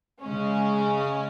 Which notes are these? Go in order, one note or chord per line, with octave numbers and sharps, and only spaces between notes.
C#3 G#3 C#4